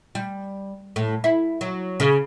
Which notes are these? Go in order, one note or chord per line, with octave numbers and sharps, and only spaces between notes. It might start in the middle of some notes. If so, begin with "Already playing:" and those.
G3
A2
E4
F#3
C#3